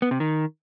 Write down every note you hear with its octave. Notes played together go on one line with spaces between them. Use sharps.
B3
C3
D#3